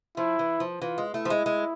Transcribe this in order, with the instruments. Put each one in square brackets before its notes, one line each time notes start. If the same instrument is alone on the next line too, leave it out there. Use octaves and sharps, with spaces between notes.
[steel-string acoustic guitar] F3 [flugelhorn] E4
[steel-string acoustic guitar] E3
F3
[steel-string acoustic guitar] E3 [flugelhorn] F4
[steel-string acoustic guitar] G#3
[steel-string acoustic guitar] A3 [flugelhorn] E4
[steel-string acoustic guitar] F3
G#3
G#3